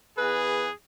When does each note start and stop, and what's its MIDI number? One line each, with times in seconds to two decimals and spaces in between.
0.18 0.67 40
0.18 0.74 68
0.18 0.67 71